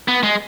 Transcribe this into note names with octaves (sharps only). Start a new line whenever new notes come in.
B3
G#3